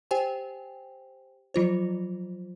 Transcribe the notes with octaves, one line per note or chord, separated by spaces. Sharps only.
G4 C5 G5 G#5
F3 F#3 F4 C5